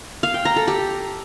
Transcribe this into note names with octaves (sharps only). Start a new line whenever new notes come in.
F5
G5
A#5
A4
G4